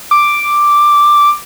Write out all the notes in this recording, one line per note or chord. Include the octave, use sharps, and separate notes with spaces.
D6